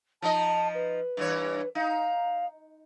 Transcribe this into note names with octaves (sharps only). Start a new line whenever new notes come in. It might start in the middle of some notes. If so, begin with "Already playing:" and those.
F3 D#4 D#5 A5
B4
G2 E3 C#5
D#4 F5